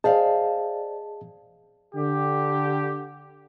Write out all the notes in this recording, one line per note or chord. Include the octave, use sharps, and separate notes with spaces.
G#4 C5 D5 D#5 F5 A5
D3 G4